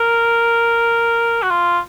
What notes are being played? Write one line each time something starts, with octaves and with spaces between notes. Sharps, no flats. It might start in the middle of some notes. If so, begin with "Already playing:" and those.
Already playing: A#4
F#4
F4